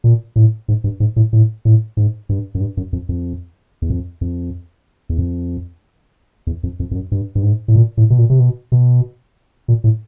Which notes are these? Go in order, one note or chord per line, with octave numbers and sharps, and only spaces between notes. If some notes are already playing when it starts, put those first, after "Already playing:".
A#2
A2
G#2
G2
G#2
A2
A2
A2
G#2
G2
F#2
G2
F#2
F2
F2
E2
F2
F2
E2
F2
E2
F2
F2
F2
F#2
G2
G2
G#2
A2
A#2
A2
B2
A#2
C3
B2
B2
A#2
A2